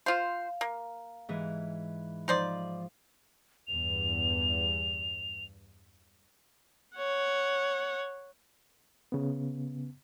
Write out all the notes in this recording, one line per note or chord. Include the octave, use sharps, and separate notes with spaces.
F4 C5 F5
A#3
G#2 E3
F3 D#4 C5 D5
E2 G2 F7
C#5 F#5
C#3 B3